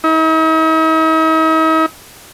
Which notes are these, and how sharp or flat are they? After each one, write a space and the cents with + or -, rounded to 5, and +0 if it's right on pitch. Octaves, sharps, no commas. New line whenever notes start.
D#4 +45